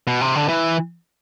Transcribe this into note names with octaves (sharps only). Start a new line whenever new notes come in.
B2
C3
D3
E3